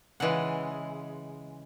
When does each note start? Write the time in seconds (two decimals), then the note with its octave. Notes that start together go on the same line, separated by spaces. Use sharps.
0.20 C#3 E3 G#3 F#5